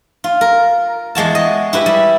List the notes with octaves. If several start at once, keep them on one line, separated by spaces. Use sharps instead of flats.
F4
A#4
E2 G#3 F#4 A5
D#5
E4 G4 B4
G3